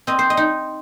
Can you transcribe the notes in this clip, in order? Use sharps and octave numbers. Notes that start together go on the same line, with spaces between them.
C4 D#5
C5
D#5
D#4